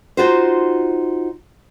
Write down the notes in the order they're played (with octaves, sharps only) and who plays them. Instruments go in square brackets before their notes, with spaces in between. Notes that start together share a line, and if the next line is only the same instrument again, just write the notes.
[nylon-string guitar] D#4 F4 F#4 C5